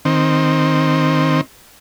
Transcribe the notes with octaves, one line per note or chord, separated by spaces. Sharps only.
D#3 C4